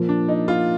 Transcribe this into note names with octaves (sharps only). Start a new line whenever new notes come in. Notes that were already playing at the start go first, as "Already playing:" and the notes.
Already playing: A#2 F3 A#3
D4
D#4
F4